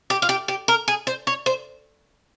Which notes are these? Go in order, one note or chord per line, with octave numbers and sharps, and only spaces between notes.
G4
F4
G4
G4
A#4
G#4
C5
C#5
C5